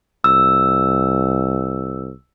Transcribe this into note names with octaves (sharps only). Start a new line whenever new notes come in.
C2 E6